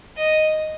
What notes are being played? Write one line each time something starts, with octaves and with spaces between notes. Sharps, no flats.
D#5